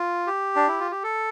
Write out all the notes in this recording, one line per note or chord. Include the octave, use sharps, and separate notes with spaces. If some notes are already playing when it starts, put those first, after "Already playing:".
Already playing: F4
G4
D4
E4
F4
G4
A4